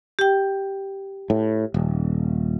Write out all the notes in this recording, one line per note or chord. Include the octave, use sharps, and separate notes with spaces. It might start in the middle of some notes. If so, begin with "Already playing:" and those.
G4 G5
A2
D#1